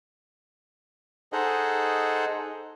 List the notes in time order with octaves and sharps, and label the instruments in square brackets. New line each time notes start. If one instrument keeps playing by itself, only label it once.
[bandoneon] D#4 G#4 A4 C5 D#5 F#5